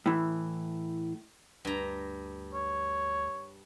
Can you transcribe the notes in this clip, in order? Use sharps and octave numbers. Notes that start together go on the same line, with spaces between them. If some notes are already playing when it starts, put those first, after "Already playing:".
A2 E3
D2 G2 A#5
C#5